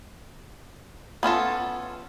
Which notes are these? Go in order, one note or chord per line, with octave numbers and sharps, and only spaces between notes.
B3 C#4 F4 A4